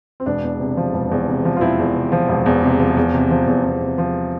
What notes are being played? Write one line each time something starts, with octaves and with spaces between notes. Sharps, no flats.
C4
E1 D4
E2
C3
F3
E1
E2
C3
F3
F4
E1 C4 E4
E2
C3
F3
E1
E2
C3
F3
E2
C3
F3
E2
E2
C3
F3